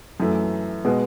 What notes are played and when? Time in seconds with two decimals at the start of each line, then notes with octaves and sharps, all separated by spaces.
0.20 F#2 E3 A3
0.85 B2 G#3 B3